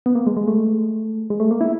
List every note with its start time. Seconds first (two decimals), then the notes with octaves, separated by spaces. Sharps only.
0.06 B3
0.15 A#3
0.27 G#3
0.37 G#3
0.48 A3
1.30 G#3
1.40 A3
1.51 A#3
1.61 E4